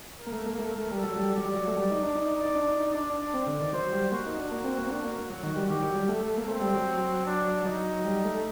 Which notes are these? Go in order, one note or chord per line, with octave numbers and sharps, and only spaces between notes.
A#4
A#3
A3
A#3
A3
A3
G3
A4
F#3
G3
F#3 D5
G3
F#3
A3
G3
D#4
D4
D#4
D#4
D4
D#4
D#4
D4 D5
D4
C4
D3
D#3
F#3 C5
G3
A#3 F#4
D#4
D4
A#3
C4
A#3
C4
D4 F#4
A#3
F#3 F#4
D#3
G3
D#3 G4
F#3
G3
A3
A#3
A3 C4
G3
F#3
D4
F#3 D#4
G3
A3